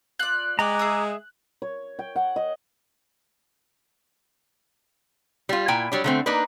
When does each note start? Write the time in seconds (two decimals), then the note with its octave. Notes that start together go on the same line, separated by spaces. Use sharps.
0.19 F4 D5 F#6
0.59 G#3 G4 D5 A#5 D6
0.79 G#4 E5 D#6
1.62 C#5
1.99 G5
2.16 F#5
2.36 D#5
5.49 G3 F4
5.68 A#2 E4 G5 G#5
5.92 F#3 G3 D4
6.04 D3 A3 C4
6.26 A#3 D4 D#4 B4